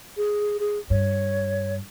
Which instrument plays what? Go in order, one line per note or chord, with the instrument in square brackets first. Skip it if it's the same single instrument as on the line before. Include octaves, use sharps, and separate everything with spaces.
[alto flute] G#4
G#4
[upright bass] G2 [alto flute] C#5